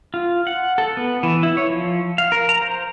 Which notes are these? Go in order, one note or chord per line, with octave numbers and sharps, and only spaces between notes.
F4
F#5
A4
B3
E3
E4
C#5
F3
F5
A#4
A#5
C5